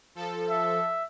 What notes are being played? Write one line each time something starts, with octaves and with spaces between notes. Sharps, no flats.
F3 A4
E5